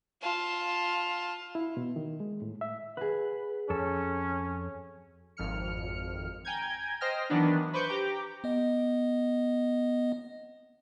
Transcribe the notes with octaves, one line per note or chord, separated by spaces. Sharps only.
F4 A5
E4
B2
D#3
G#3
A2
E5
F#4 G#4 B4
F2 C#4 A4
G#1 F2 F6 C#7
G5 G#5 A#5 G6 G#6
C5 D#5 G5 F6 A#6
D#3 E3 F#3 B3 D4
B4 C5 C#6 D6 G6
G4 G5 A#5 D6
B3 D#5